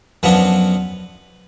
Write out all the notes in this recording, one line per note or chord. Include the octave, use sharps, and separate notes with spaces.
F#2 F3 B3 D4 B4